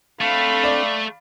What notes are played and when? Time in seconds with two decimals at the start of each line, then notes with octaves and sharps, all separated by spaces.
0.21 A3 C4 D4 A4 F5 B5
0.64 D5